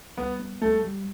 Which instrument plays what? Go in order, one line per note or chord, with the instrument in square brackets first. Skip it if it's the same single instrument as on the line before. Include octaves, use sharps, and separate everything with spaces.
[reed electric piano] G3 [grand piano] B3
[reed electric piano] B3
[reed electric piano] G3 [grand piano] A3
[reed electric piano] G3